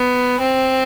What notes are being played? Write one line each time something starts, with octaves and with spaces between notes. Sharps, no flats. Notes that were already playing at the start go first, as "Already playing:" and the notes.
Already playing: B3
C4